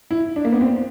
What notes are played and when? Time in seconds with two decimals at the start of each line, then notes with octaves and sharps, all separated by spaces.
0.11 E4
0.36 D4
0.45 A#3
0.52 B3
0.61 C4